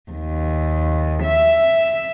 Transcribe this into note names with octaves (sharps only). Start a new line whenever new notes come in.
D#2
E5